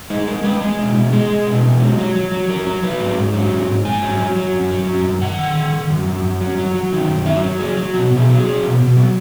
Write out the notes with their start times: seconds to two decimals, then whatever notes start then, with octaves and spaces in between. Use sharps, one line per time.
0.10 G#3 D#4
0.28 G#3 A#4
0.44 G#3 B4
0.61 G#3
0.78 B2
0.95 G#3
1.13 G#3 G#4
1.30 G#3
1.47 B2
1.64 G#3
1.80 F#3
1.98 F#3
2.15 F#3
2.32 F#3
2.48 F#3 A#4
2.66 F#3
2.83 F#3 B4
3.00 G#2
3.17 G#2
3.34 F#3
3.51 G#2
3.68 G#2
3.85 G#2 G#5
4.02 F#3
4.19 F#3
4.37 F#3
4.53 F#2
4.71 F#3
4.87 F#2
5.04 F#2
5.22 D#3 F#5
5.39 D#3
5.55 D#3
5.72 D#3
5.90 F#2
6.07 F#2
6.24 F#2
6.41 F#3
6.58 F#3
6.75 F#3
6.92 D#3
7.09 F#2
7.26 F#3 E5
7.44 F#3
7.60 F#3 G#4
7.77 F#3
7.94 B2 F#4
8.11 B2
8.17 G#4
8.29 F#3
8.40 F#3 G#4
8.63 B2
8.79 B2
8.97 F#3